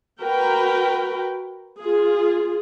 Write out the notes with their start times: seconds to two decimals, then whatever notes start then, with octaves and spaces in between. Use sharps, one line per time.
0.22 F#4 A#4 B4 G5
1.80 F4 G#4